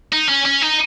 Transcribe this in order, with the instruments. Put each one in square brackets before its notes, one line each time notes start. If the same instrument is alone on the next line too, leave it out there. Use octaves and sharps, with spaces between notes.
[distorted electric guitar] D#4
C#4
C#4
D#4